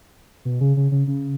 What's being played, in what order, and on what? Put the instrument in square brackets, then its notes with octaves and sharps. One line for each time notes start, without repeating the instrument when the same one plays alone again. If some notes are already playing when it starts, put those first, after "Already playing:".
[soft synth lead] B2
C#3
C#3
C#3
C#3